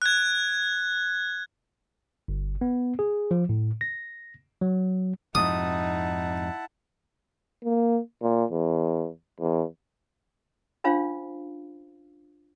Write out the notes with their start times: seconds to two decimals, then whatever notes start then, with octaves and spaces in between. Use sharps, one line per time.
0.02 F#6 G#6
2.28 G1
2.61 B3
2.99 G#4
3.31 F3
3.49 A2
3.81 A#6
4.61 F#3
5.35 F2 G#2 C3 D#4 E4 F#5 A5 D#6
7.64 A#3
8.22 A#2
8.51 E2
9.41 E2
10.84 C#4 D4 F4 C5 F5